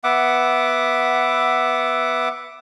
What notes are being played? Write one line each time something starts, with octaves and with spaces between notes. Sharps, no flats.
B3 E5 F#5 D6